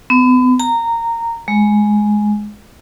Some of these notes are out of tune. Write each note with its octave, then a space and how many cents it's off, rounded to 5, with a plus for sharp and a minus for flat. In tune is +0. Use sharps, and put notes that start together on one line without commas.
B3 +40
A#5 -15
G#3 +10